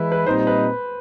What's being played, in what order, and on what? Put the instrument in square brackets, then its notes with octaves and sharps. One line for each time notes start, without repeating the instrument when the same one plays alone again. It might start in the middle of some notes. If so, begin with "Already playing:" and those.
Already playing: [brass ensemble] E3 G#3 E4 [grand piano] B4
[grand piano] B4
[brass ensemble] A#2 G3 C4 D#4 [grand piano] C5
[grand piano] B4